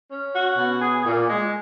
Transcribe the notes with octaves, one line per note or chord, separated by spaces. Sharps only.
C#4
F#4
B2
G#4
A#2
G#3